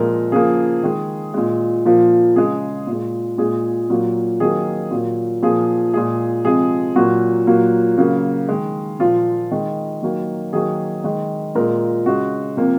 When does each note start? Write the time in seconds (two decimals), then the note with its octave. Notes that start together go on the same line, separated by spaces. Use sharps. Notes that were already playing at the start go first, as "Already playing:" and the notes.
Already playing: A#2 F3 G#3 A#4
0.32 C#3 F3 A#3 G#4
0.83 D#3 G#3
1.34 A#2 G#3
1.85 A#2 F3 A#3
2.36 C#3 G#3 G#4
2.87 A#2
2.92 G#3
3.38 A#2 G#3 G#4
3.90 A#2 F#3 A#3
4.40 D#3 F#3 A#3 G#4
4.91 A#2 F#3 A#3
5.42 A#2 F3 A#3 G#4
5.94 A#2 G#3 G#4
6.45 C3 F3 G#3 G#4
6.96 A#2 F#3 A#3 F#4
7.47 A#2 F#3 A#3
7.98 C#3 F#3 A#3
8.49 D#3 G#3
9.00 A#2 F3 A#3 F4
9.51 D#3 G#3
10.02 D#3 F#3 A#3
10.53 D#3 F#3 A#3 G#4
11.04 D#3 G#3
11.55 A#2 G#3 A#4
12.06 C#3 G#3 F#4
12.57 C3 F3 A#3